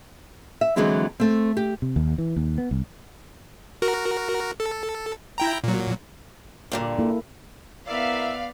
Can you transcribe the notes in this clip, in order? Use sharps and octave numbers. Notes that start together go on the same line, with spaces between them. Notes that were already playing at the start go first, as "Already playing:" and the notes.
E5
D3 E3 F#3 G#3 C4 E4
A3 C4
G4
C3
D#2
E3
D#2
B3
C2
F#4 A#4
A4
E4 G5 A#5
A#2 F#3
G2 A#2 D3
A#3 E4 A4
B3 E4 A#4 D5 E5 F5